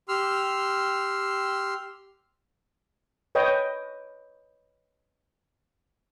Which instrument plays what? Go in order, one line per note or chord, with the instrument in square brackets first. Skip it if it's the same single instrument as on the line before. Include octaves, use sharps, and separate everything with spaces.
[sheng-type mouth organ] G4 C6 E6 F6
[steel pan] B4 C#5 D#5 G5